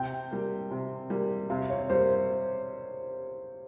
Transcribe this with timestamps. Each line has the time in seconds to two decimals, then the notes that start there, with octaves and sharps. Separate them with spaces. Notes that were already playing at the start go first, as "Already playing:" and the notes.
Already playing: C3 G5
0.31 G3 A#3
0.71 C3
1.10 G3 A#3
1.50 C3 F5
1.70 C#5
1.90 G3 A#3 C5